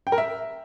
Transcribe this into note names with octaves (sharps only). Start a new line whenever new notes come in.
G5
A#4
E5